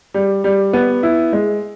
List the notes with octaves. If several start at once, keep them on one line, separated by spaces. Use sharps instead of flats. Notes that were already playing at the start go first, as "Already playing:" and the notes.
G3
G3
B3
E4
G#3